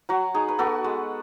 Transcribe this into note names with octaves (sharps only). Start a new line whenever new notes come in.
F#3 F#4
D#4 G#4
B4
B3 F#4 A4
G#3